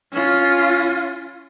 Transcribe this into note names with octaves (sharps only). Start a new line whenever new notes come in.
C#4 F4